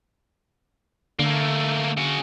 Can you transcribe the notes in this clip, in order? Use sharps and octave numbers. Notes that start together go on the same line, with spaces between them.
D3 A3 A#3
C#3 F#4